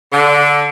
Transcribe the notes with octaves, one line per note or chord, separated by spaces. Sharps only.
D3